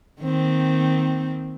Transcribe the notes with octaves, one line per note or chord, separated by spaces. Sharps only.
D#3 A#3 C4